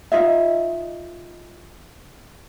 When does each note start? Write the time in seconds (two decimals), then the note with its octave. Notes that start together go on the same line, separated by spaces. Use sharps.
0.12 D#4 F4 D#5 E5